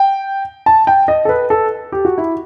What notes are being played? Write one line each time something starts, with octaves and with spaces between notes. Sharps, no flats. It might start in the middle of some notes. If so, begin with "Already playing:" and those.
Already playing: G5
A5
G5
D#5
A4
B4
A4
G4
F#4
E4